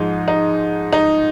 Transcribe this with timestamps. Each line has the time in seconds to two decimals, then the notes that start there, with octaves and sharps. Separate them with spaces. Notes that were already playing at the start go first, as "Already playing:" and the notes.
Already playing: G#2 F3 G#3 D#4
0.28 D#4
0.93 D#4